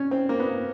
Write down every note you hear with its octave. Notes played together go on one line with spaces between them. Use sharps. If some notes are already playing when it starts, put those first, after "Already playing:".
Already playing: C#4
C4
A#3
B3